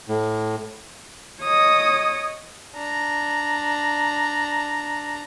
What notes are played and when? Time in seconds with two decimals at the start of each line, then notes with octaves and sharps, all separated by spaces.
0.08 A2
1.43 C#5 D#5 D#6
2.75 D4 A#5